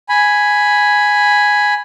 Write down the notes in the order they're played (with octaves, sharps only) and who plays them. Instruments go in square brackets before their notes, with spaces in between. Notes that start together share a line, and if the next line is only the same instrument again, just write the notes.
[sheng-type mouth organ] G#5 B5